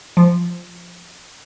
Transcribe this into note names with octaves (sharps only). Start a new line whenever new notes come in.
F3